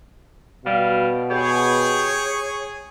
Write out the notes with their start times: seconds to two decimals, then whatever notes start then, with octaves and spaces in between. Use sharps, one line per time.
0.66 B2 G3 F5
1.31 G4 G#4 C#5